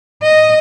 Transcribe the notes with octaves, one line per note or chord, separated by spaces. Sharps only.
D#5